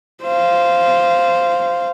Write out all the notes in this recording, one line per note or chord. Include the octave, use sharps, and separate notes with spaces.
C5 F5